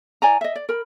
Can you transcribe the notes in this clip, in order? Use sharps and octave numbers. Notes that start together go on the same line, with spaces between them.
E4 D5 G#5 A#5
D#5 E5
D5
A#4 B5